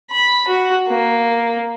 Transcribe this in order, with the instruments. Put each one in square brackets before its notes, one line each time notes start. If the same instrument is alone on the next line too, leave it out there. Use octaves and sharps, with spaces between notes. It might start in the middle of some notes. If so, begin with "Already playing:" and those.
[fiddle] B5
F#4
A#3